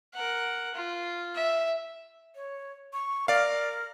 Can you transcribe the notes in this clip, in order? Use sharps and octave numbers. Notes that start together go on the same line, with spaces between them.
A#4 F#5
F4
E5
C#5
C#6
A#4 D5 F5